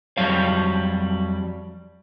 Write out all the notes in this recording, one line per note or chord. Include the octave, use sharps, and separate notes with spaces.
F2 F#3 G3 F5